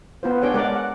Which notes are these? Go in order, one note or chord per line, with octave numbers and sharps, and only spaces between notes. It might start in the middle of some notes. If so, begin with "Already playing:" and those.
B3 F4 C5
D4 G#4 C#5 G5
G#3 A#4 D5 F#5
F#5